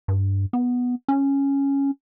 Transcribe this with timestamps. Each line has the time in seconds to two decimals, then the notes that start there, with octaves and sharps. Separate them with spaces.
0.08 G2
0.53 B3
1.08 C#4